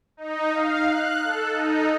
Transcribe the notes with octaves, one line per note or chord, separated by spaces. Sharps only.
D#4
F5
F#6
A4
D#4